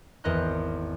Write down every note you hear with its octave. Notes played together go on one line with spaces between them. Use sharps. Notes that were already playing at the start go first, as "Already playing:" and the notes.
G#1 E2 A#4 D#5 C6 F#6